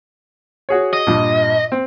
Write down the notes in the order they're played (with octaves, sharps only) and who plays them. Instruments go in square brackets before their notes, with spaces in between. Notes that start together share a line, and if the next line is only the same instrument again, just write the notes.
[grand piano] F#4 G#4 C#5
[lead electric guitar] D#5
[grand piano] G2 A#2
C4